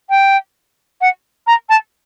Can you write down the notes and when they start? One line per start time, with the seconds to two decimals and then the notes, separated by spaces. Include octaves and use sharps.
0.10 G5
1.01 F#5
1.47 A#5
1.69 A5